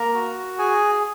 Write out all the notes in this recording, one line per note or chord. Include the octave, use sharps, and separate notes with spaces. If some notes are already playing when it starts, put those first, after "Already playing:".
Already playing: A#3 A#4 A#5
F#4
G#4 G#5